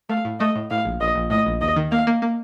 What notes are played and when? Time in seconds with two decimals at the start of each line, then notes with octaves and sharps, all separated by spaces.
0.09 A3 F5
0.25 A2
0.40 A3 D#5
0.56 A2
0.70 A2 F5
0.85 A#1
1.00 A#1 D#5
1.15 A#1
1.30 A2 D#5
1.46 A#1
1.61 D#2 D#5
1.76 D#3
1.91 A#3 F5
2.07 A#3
2.22 A#3